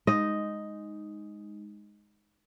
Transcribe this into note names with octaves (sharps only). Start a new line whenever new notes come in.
G#3 D#4 D#5